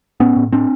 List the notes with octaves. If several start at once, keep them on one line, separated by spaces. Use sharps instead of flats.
A2 B3 C#4
A2
A2 C4 D4